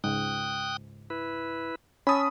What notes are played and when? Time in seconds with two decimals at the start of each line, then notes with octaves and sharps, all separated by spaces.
0.04 C#2 G#2 G5 D#6 F#6
1.10 E4 B4
2.07 C#4 A5 B5 D#6 E6